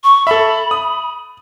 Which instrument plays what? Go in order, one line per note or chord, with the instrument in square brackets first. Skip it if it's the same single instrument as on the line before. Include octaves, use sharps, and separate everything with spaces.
[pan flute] C#6
[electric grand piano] A4 E5 [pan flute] B5
[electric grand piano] D#6